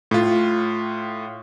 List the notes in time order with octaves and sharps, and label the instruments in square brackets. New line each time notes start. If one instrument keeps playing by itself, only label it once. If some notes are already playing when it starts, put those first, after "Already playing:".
[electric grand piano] A2 F4